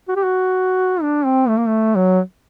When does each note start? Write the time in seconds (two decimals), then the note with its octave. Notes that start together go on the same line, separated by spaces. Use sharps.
0.08 F#4
0.16 G4
0.23 F#4
1.02 D4
1.25 C4
1.48 A3
1.57 A#3
1.67 A3
1.96 F#3